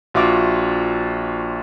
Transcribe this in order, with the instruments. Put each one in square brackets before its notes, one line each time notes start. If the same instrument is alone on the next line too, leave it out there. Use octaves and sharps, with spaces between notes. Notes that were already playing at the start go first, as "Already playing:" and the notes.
[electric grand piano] A#1 F4 F#4 E5 D6